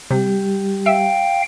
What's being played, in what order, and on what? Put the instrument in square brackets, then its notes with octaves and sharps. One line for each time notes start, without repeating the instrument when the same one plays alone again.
[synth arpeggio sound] C3 [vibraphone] G3 G4
[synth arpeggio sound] E5 [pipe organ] F5 G5